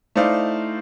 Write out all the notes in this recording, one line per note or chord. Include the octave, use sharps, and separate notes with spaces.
A3 D#4 E4 C5 D5 F5